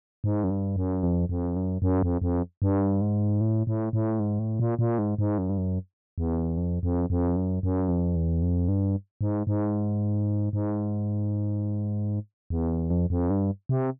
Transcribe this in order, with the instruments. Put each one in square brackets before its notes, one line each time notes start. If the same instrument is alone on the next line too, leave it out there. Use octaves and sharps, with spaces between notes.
[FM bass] G#2
F#2
G2
F#2
F2
F2
F#2
F#2
F2
F2
G2
G#2
A2
A2
A2
G#2
A2
A#2
A#2
G#2
G#2
F#2
G2
F#2
E2
F2
F2
F2
F#2
F#2
F2
E2
F2
G2
G#2
G#2
G#2
E2
F2
F2
G2
C3